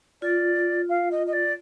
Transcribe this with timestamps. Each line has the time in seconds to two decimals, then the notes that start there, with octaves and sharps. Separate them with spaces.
0.22 F4 D5
0.89 F5
1.11 D#5
1.27 D#5
1.33 D5